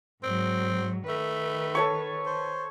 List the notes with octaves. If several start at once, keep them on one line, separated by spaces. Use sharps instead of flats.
G#2 F#3 C4
D#3 A3 B4
A4 C#5 C#6
C5